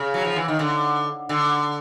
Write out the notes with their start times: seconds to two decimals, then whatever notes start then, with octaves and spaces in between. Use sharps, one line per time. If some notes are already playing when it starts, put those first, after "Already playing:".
Already playing: C#3
0.14 F#3
0.25 F3
0.36 E3
0.48 D#3
0.59 D3
1.29 D3